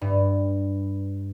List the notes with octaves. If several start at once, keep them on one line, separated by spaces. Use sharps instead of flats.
G2